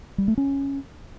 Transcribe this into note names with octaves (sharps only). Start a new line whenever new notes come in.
G3
A3
C#4